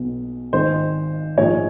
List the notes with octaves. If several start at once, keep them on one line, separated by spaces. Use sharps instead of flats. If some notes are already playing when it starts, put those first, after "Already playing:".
Already playing: B1 B2
G#1 G#2 D#3 C5
A#1 G#2 F3 C#5